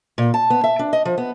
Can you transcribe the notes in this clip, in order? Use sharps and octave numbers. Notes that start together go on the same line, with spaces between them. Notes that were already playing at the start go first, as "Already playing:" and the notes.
A#2
A5
B3
E5
D4
D#5
F3
B3